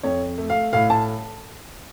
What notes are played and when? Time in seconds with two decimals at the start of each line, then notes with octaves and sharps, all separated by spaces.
0.03 F2 C#5
0.38 A3
0.50 F5
0.73 A2 F5
0.90 A5